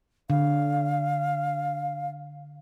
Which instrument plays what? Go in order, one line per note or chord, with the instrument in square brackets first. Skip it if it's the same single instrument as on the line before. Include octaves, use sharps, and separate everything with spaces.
[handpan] D3 [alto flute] F5